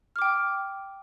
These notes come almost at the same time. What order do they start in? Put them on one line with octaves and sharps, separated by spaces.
F6 D6 G5 D#6